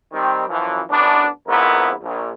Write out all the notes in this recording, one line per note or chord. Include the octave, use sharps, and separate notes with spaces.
D#3 G3 C4
F#2 E3 F3
A1 F#2 B3 D4
A#1 F2 G#2 B3 E4 A#4
A#1